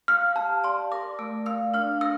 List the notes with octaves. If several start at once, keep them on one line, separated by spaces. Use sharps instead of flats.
F5 F6
G4 A5
D5 C6
A#4 D6
A3 E6
F5 E6
D4 F6
A#4 E6